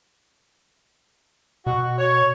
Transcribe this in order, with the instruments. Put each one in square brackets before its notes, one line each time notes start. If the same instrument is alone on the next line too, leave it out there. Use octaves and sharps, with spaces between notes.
[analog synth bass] B2 [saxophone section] F#4
[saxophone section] C#5